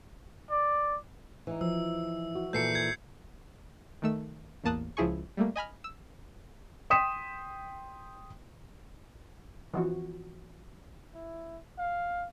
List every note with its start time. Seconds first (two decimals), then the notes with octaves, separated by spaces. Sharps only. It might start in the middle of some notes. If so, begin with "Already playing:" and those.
0.50 D5
1.47 E3 D#4
1.61 F3 E6
2.35 F#4
2.53 A#2 E3 A4 G6 C7 C#7
2.75 G#6
4.02 D#3 A3 E6
4.64 A1 E2 A#3 A5 D#6 F#6
4.97 C#2 F3 E4 G#4 G#5 C#6
5.37 G3 A3 A#3
5.56 D#5 G#5 B5 F6
5.84 E6
6.90 G5 C6 D#6 B6 E7
9.74 E3 F3 F#4
11.14 E4
11.78 F5